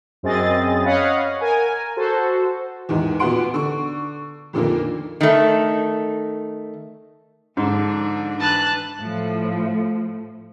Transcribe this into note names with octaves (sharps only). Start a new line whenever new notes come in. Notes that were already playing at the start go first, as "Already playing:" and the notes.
F#2 C4 G#4 D#5 A6
C#5 D#5 F5 F#5 B5
A#4 G#5
F#4 A4 C5
E2 G#2 D#3
A#2 B3 F#4 F#5 C6 D7
D3 C#6
F2 A#2 D3 D#3 A#3
D#3 A3
G#2 D3 F3 D4
E3 D4 B4 A5 F#6
A2 F3